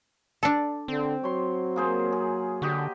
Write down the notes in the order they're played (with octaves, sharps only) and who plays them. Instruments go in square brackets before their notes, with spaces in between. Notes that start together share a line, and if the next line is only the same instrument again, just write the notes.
[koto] D4 A4
[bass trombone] D3 [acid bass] C4
[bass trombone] F#3 [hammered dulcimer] C#5 C6
[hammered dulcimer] A#3 G#4 C5
G#4
[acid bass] D3 [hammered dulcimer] F#4 G4 D#5